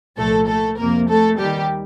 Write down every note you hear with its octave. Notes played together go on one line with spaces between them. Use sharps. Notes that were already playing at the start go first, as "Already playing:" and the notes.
C2 A#2 F3 A3 A4
A3 A4
F2 C3 F3 A#3 A#4
A3 A4
D#2 D#3 G3 G4